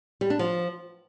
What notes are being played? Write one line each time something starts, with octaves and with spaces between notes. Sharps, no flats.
G3
D4
F3